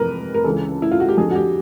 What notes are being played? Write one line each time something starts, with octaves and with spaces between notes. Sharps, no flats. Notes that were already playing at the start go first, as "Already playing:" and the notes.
Already playing: F2 C3 E3 A#4 B4
A#4
C#2 C#3 E3 A4
E4
F4
F#4
G4
F2 D3 G#4
F#4
G4